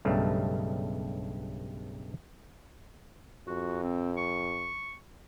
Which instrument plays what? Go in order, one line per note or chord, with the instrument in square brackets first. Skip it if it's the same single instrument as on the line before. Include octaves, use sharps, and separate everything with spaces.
[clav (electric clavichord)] B1 G2 C#3 G3 A3
[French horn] F2 [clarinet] F#4
[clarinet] C4
C#6